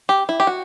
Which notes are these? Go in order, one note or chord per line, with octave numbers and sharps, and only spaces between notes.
G4
E4
G4
F#4